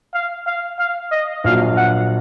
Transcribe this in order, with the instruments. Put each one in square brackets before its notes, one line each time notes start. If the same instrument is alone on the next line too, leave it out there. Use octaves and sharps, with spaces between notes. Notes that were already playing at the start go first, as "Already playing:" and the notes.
[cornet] F5
F5
F5
D#5
[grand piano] A#1 A#2 F#3 [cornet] F5
[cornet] F#5